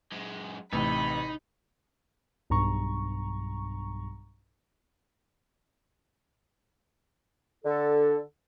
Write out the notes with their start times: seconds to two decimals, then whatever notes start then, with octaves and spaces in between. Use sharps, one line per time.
0.12 F#2 G#3
0.73 A1 C3 D#4 B5
2.50 B1 G2 A#5 C#6
7.65 D3 A4